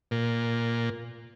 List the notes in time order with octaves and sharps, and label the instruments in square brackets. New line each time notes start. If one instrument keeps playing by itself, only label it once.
[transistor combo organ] A#2